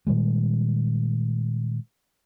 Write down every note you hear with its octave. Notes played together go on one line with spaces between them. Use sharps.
A#2 D#3 G3 G#3